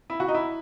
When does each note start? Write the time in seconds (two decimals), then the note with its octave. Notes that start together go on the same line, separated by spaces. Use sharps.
0.10 E4
0.20 F#4
0.28 D#4
0.35 E4